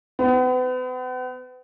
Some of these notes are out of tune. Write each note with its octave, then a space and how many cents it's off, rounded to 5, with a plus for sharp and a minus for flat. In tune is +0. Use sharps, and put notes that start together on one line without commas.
B3 +40